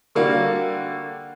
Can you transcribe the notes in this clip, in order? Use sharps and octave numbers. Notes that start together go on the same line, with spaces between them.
D3 G3 A#3 F#4